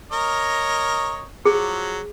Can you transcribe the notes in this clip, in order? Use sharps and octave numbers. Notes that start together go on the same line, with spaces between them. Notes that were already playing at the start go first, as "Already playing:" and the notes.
A#4 C#5 D#5
F3 F#3 G#4